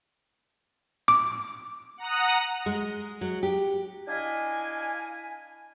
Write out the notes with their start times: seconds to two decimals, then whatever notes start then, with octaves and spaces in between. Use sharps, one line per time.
1.08 D6
1.98 F#5 A#5 D#6
2.66 G#3
3.21 F#3
3.43 G4
4.08 D4 E4 D#5 F5 G#5